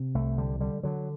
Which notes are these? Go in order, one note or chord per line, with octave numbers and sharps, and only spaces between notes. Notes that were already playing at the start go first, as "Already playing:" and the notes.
Already playing: C3
C2 A3
D3 G3
D3 G3
D3 F#3